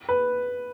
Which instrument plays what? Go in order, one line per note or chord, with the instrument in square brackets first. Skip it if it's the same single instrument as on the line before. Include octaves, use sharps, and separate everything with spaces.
[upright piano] B4